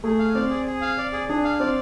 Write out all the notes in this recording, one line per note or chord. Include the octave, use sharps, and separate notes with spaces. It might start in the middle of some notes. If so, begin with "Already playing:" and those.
A3 G#4
F5
C4 D5
G#4
G#4
F5
D5
G#4
D4 G#4
F5
C4 D5